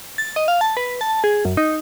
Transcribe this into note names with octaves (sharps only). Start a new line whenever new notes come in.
A6
D#5
F5
A5
B4
A5
G#4
F#2
D#4